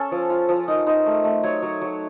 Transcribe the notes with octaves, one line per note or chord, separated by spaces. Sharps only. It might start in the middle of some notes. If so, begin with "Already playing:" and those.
Already playing: C#4 A4
F3
F4
F3
D#4 A#4
D#4 C5
A3
A3
F#3 C#5
F#3
F#3